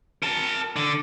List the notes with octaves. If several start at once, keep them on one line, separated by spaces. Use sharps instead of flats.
A#4 A5
D3